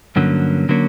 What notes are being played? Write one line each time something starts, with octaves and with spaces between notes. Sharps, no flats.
G2 D3 F#3 A#3 C#4
D3 F#3 A#3 C#4